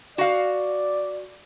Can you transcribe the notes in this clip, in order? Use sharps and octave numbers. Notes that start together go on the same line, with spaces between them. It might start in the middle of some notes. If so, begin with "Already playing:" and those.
F#4 D5 F5